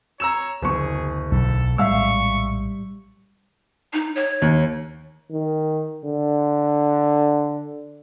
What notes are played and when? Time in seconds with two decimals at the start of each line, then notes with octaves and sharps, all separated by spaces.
0.20 C#5 A#5 E6 E7
0.62 F#1 D2 F#3 B3 G#4 C#6
1.32 B1 A4
1.78 A#1 A2 G3 G#3 E5 F5 C#6 E6
3.93 D#4
4.15 C#5
4.42 D#2
5.31 D#3
6.05 D3